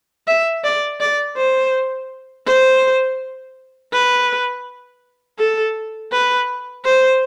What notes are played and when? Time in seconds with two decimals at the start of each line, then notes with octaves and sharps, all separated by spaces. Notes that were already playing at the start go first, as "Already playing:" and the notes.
0.27 E5
0.64 D5
1.01 D5
1.37 C5
2.47 C5
3.93 B4
5.39 A4
6.12 B4
6.85 C5